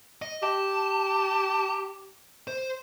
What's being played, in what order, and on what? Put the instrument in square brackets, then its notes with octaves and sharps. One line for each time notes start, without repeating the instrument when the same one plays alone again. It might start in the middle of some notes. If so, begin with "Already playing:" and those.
[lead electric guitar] D#5
[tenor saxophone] G4 [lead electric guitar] A5
[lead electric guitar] C5